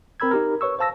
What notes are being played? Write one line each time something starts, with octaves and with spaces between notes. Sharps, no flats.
C4 A#4 B5 E6 G#6
D#4 G4 A#4
B4 C#5 C#6 E6
C5 F5 A5 E6 A#6